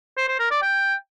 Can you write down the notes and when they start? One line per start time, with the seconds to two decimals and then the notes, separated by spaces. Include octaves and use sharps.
0.17 C5
0.28 C5
0.39 A#4
0.51 D5
0.62 G5